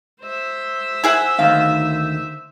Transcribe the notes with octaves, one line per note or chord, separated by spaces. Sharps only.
C5 E5
E4 G#4 F#5
D2 D#3 F5